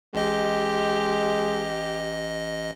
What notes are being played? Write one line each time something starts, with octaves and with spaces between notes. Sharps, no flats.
A1 G#3 G4 D#5